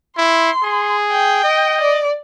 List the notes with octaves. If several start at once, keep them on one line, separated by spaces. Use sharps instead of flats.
E4 C6
G#4
G5
D#5
D5